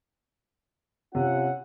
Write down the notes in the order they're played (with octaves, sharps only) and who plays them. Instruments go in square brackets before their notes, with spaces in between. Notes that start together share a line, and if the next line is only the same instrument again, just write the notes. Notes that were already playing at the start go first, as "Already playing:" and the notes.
[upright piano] C3 [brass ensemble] C#4 F4 F#5